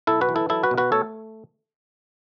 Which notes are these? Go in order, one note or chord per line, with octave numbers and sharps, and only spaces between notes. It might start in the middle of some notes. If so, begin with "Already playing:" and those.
B1 E4 A4
F#4 B4
E3
E4 A4
F#3 E4 A4
F#4 B4
B2
F#4 B4
A3 A4 C#5